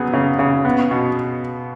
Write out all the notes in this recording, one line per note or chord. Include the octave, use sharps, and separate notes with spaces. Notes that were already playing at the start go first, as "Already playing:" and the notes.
Already playing: C#3 F#3 B3 G#4
C#3
C#3
B3
B2